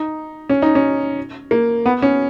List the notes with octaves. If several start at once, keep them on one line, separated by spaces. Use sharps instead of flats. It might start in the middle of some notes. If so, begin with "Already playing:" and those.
Already playing: D#4
C#4
D#4
C#4
A#3
B3
C#4